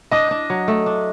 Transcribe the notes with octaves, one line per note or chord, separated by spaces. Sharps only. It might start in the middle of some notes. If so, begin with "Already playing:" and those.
D4 D#5
D4
F#3
A3
D4